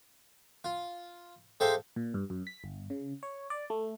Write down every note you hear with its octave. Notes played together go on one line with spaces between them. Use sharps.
F4
G#3 G4 A4 C5 E5 F5
A#2
G2
F#2
B6
G1
C#3
C#5
D5
A3